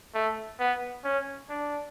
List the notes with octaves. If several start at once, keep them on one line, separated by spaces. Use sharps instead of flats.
A3
B3
C#4
D4